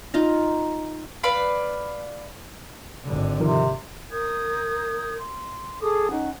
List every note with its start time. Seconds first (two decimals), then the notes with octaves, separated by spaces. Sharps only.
0.14 D#4 F4 A#5
1.24 B4 D5 F5 B5
3.04 G#1 D3
3.40 C3 D#3 F3 A#4
4.11 A#4 D#6 G6 G#6
5.18 C6
5.82 G#4 A4 D6 D#6
6.10 C#4 D#4 F#5